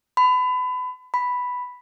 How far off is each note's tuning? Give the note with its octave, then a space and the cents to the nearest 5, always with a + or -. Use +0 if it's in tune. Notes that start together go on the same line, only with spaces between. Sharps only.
B5 +30
B5 +0